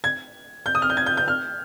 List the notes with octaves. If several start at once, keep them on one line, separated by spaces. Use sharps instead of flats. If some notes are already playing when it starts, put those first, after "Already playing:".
G#6
G6
D#6
F6
G6
G#6
G6
G6
F6